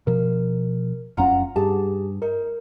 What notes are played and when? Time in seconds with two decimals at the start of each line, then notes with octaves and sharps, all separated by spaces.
0.07 B2 F3 A#4
1.17 F1 F#2 C#4 F4 F#5 A#5
1.56 G2 G4 G#4 A5
2.22 D#4 A#4